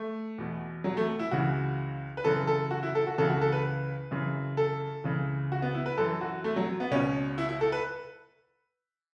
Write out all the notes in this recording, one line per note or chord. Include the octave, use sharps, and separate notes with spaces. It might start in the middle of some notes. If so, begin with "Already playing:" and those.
Already playing: A3
E2 B2
F#3
A3
E4
C#2 C#3 E3 F#4
B4
F#2 C#3 E3 A4
A4
F#4
E4
A4
F#4
C#2 C#3 E3 A4
F#4
A4
B4
F#2 C#3 E3
A4
C#2 C#3 E3
F#4
B3
E4
B4
F#2 E3 A4
F#4
A3
F#3
B3
C#2 B2 C#4
E4
E4
A4
B4